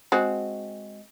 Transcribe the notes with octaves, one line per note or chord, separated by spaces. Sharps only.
G#3 C4 F#4